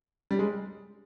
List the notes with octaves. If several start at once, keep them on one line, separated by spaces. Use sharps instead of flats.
G3
G#3